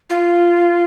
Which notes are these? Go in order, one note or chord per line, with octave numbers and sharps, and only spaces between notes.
F4